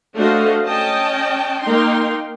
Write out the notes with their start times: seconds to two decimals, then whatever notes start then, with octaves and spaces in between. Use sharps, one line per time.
0.15 A3 D4 F#4 C5 D#5 F5
0.64 C#4 D#5 G5 A5
1.62 A#3 D#4 G5 C6